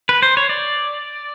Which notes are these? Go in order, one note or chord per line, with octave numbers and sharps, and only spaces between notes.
B4
C5
C#5
D5